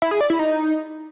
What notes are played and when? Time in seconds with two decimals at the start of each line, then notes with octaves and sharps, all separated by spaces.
0.02 E4
0.11 G#4
0.21 D5
0.30 E4
0.39 D#4